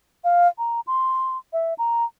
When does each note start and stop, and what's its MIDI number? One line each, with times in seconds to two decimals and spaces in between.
0.24 0.48 77
0.58 0.80 82
0.87 1.38 84
1.53 1.74 76
1.78 2.04 82